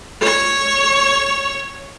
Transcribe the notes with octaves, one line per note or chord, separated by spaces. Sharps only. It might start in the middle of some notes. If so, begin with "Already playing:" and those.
C#5 C#6